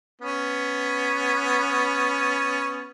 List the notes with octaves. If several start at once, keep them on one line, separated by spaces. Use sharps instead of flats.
B3 C#4